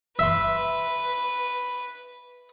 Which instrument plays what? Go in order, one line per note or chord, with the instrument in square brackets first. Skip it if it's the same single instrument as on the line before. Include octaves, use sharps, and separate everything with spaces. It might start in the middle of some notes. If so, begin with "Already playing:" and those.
[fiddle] B4 [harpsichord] E5 C6